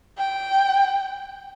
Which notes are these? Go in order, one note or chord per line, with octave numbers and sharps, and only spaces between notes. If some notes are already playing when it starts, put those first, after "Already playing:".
G5